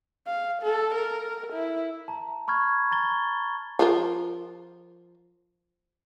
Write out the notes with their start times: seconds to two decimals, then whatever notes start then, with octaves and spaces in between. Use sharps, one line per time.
0.27 F5
0.62 A4
0.94 A#4
1.52 E4
2.08 A5 A#5
2.48 B5 C#6 F6 G#6
2.91 A#5 A6 G7
3.79 F3 F4 A#4